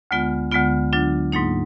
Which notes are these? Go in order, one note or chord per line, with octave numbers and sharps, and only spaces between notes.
D2 D3 G#3 B3 F4
D2 D3 G#3 B3 F4
D3 F#3 D4 F4
G#2 F#3 A#3 D#4